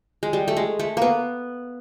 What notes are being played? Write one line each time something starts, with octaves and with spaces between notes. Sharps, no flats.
G#3
G3
A3
G#3
A3
A#3 B3